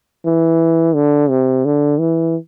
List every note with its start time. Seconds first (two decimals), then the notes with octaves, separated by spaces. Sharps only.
0.26 E3
0.95 D3
1.30 C3
1.65 D3
1.99 E3